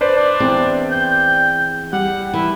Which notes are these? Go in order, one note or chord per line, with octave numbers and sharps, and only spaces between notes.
D4 B4 C5 D5
D4
E2 C4
G5
G3 F#5
E3 E4